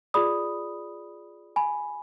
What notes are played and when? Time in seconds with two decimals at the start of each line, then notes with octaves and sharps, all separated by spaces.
0.14 F4 G#4 D5 B5 D#6
1.56 G#5 B5